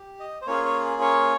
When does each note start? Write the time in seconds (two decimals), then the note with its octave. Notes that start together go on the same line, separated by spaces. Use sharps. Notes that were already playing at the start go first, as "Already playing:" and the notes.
Already playing: G4
0.20 D#5
0.42 C5
0.47 A#3 C#4 F4 G#4 C#5
0.65 C#5
1.01 C#5